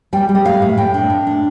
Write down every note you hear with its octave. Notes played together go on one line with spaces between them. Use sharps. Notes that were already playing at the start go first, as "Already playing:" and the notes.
G3 G5
G3
D#5
A2 F5
A2
A2 G5
D4
A2
D4